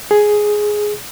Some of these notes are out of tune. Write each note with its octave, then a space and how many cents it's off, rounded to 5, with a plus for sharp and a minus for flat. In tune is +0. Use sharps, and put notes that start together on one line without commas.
G#4 +5